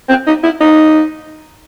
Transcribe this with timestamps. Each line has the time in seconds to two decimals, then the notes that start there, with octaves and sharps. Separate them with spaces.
0.09 C4
0.27 D#4
0.44 E4
0.61 D#4